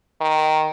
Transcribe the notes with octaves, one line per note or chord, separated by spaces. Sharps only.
D#3